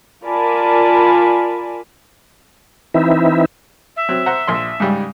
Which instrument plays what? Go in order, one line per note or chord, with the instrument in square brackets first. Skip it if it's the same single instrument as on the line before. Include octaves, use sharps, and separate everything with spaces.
[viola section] F4 A#4 D5 G#5 A5 B5
[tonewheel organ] E3 C4 D#4 E4 E5
[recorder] E5
[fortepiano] F#3 C4
C5 F#5 A#5
A#1 C6
G#2 C#3 G3